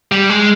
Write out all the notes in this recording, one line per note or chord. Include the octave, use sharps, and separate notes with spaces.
G3
G#3